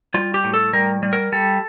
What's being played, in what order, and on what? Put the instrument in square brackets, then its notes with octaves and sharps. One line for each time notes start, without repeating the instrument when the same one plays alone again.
[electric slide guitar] G3 F4
G4
A2
A4
G3 A#4
G3
A#4
G3 A4